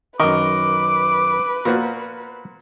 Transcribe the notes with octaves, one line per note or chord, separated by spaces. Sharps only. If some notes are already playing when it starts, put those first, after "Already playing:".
F#2 D#3 A#4 B4 D#5 C#6 D6
A#2 B3 F#4 C5 F5 A#5